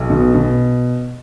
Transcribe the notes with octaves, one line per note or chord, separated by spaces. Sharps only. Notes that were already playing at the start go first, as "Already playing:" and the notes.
Already playing: B1
B2
B2